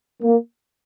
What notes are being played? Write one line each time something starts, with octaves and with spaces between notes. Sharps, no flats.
A#3